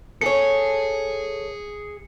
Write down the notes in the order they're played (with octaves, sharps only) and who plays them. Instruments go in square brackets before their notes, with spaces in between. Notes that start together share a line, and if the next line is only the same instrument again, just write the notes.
[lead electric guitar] G#4 G#5 [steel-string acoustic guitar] A4 C#5 [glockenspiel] C#7